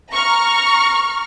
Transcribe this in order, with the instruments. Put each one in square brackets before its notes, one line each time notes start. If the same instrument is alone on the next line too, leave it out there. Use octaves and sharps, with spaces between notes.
[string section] A#5 C#6 F6